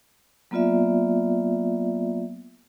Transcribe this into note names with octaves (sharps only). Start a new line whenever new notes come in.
F#3 A#3 B3 F4 D5 E5